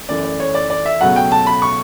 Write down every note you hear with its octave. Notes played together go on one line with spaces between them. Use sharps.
F#2 E3 A3 D5
D5
C#5
D5
D5
E5
C#2 B2 F#3 A3 F#5
G5
A5
B5
C#6